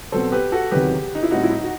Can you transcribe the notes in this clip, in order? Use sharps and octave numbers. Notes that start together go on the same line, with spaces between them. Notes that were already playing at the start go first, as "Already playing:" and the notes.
B2 F#3 C4 A4 C5
G4 B4
F#4 A4
E2 C3 D#3 F#3 G4 B4
D#4
E4
A2 G3 C4 D#4 F#4
E4
D#4
F#4